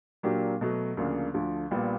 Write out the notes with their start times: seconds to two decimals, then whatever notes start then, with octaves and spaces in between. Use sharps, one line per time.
0.23 A#2 F#3 A#3 D4 G4
0.61 B2 F#3 A3
0.97 D2 C#3 F3 A#3 D4
1.33 D2 D3 F3
1.71 A#1 A#2 G3 B3